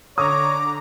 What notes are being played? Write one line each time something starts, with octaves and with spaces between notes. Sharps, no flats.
D3 C#5 A#5 D6 D#6